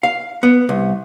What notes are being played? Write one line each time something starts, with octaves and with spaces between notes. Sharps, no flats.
F5
B3
C2